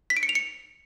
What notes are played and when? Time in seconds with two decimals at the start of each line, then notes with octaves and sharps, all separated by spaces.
0.10 B6
0.17 D7
0.23 C#7
0.29 F7
0.35 C#7